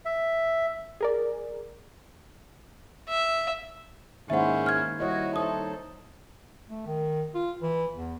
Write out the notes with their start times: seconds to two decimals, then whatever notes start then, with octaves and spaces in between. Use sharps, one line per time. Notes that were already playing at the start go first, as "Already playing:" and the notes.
0.06 E5
1.01 G#4 A#4 D5
3.09 E5
4.30 G#2 D#3 A#3 C#4 E4 C5 E5 F#5
4.66 F6 G#6
5.00 G3 E4 F#4 C#5 D#5
5.36 D#4 A4 C5 C#5 D#6
6.70 A3
6.86 D#3
7.35 F4
7.62 E3
7.95 E2